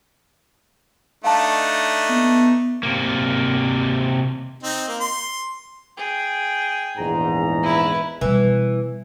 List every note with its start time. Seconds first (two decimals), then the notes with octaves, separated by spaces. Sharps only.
1.24 A3 D4 D#4 F5 A5
2.10 B3
2.83 C3 A#3
4.63 C4 D#4
4.88 A#3
5.01 C6
5.97 G#4 G5
6.98 A#1 E2 G#2 A#5
7.63 E4 B4
8.21 B2 E3 G3